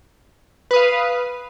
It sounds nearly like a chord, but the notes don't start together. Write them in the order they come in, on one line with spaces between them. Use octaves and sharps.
B4 D#6 F5